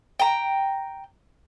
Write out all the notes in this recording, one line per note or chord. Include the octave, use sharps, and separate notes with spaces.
G5 A#5